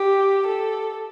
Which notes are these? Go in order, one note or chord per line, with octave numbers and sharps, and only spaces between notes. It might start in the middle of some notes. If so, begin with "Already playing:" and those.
Already playing: G4
A4